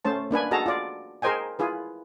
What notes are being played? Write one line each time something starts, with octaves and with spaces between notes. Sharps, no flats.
A3 C#4 C5 A5
A#3 D4 B4 G#5
F#4 G#4 A4 D#5 A5 A#5
F4 D5
G#4 A#4 C5 D#5 G5 G#5
E4 F4 G#4 B4